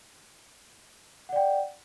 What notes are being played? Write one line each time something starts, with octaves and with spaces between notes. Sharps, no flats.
D5 F#5 G5